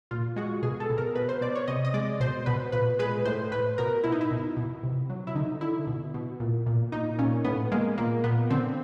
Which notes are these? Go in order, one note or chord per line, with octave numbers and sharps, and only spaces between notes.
A#2 F4
G#3 F#4
B2 G#4
A4
B2
A#4
B2 B4
C5
B2 D5
C#5
C3 D#5
D#5
G#3 D5
B2 C5
B2 B4
A#2 B4
G#3 B4
A2 C5
A2 B4
B2 A#4
B2 E4
D#4
E4
B2
B2
C3
F#3
E4
D3 D#4
D3 E4
B2
B2
A#2
A#2
A#2 D#4
A#2 C#4
A2 B3
G#3 A#3
A#2 A#3
A#2 B3
D3 C4